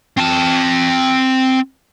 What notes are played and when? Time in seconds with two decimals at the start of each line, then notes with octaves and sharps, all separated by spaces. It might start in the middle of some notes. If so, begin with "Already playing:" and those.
0.18 C4 A5